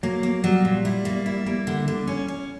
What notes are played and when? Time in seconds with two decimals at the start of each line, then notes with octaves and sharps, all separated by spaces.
0.03 F#3 A#3
0.23 A#3
0.44 F#3 G3
0.65 A#2
0.85 E4
1.05 A#3
1.26 E4
1.46 A#3
1.67 D3
1.88 D3
2.07 C#4
2.28 C#4